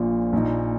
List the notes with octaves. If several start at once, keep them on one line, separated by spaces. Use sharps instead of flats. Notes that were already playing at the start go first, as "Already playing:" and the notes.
Already playing: A#1 A#2 F3
A#1 A#2 F3 D#4